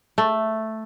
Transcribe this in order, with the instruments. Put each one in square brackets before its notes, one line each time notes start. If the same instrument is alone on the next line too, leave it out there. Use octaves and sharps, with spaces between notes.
[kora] A3